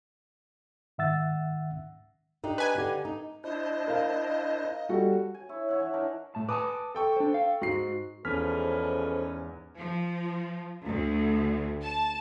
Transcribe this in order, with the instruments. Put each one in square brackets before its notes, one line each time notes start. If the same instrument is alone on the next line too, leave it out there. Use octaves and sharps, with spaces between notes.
[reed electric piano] G#2 D#3 E5 F#5 E6 A6
[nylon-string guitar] D4 D#4 G4
[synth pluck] B4 G#5
[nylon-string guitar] D3 G4
D#4
[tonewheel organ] D4 E4 C5 [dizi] D#5
[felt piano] A#4 F5
G3 F#4 A4
[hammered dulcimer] G#5
E4 C#5
C#5 E5 F#5
E3
D4 D#4 A#4 B5
[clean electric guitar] A2 A5
[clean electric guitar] B4 G#5 A5 [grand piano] D6 D#6
[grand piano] A4 G5 C#6
[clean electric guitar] D4 C5
F5
[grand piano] G#2 C7 [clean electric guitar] F#4
[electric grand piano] E2 F6 B6 [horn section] G#2 C#4 [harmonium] F3 A4 B4
[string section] F3
D2
A5